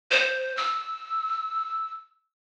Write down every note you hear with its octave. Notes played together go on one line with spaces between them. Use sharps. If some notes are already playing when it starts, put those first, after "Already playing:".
C5
E6